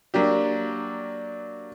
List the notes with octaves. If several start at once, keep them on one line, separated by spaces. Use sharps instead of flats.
F#3 A#3 D4 G4